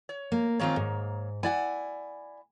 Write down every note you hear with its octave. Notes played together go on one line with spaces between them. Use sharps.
C#5
A#3
D#3 A#3 C4 F4 G#4 C#5
G#2
E4 D5 F#5 G#5